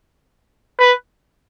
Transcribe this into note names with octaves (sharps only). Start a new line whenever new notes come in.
B4